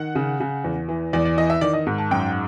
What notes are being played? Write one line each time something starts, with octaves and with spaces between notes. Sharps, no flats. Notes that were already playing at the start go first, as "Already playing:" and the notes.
Already playing: D#3 F#5
C#3
C#3
E2
E3
E2 D5
D5
E3 D#5
E5
D#3 D5
D#5
G#2
A5
F#2 G5